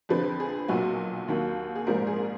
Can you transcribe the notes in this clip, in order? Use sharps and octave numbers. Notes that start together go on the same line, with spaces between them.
F2 D3 F3 B4
G#4
B1 A#2 F#3 F#4
D#2 D#3 F#3
G#4
A#1 G#2 F3 A#4
G#4